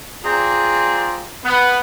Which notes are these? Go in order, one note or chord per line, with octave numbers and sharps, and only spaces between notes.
C4 F4 G#4 D5 A#5
B3